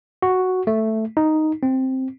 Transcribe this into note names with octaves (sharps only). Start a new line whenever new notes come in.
F#4
A3
D#4
C4